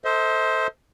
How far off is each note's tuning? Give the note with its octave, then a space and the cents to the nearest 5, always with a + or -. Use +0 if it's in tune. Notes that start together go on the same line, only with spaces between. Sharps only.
A4 +20 C5 +0 D#5 +45